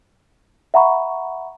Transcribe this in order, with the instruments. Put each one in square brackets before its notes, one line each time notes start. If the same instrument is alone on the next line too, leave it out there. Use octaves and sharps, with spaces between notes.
[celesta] E5 F#5 A#5 B5 C#6